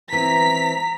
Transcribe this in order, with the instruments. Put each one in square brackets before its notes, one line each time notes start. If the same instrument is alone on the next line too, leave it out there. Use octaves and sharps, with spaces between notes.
[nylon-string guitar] E3 C4 D#4 [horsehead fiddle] A#5 [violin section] B6